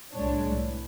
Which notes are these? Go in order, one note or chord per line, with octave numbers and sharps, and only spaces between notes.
C2 A2 G#3 D4 C#5
E3